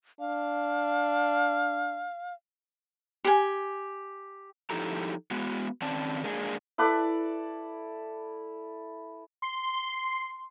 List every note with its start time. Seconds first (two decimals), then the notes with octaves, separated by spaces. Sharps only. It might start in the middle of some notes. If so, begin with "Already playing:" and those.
0.20 D4 F5
3.24 G4 G#5
4.70 F3 D#4 E4 G4 A4 A#5
5.31 G#3 B3 F#4
5.81 D#3 C4 C#4 D5 A5
6.23 G#3 A#3 D4 D#4 G#4
6.78 E4 A4 B4 D5
9.42 C6